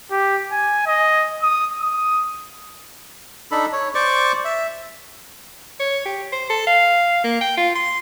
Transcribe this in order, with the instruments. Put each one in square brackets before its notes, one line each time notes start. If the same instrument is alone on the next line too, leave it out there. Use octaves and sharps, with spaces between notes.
[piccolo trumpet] G4
G#5
D#5
D#6
D#6
[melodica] D4 D#4 A4 B5
C#5
C5 D5 C#6 D6
E5
[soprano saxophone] C#5
G4
C5
A4
F5
A#3
G5
F4
C6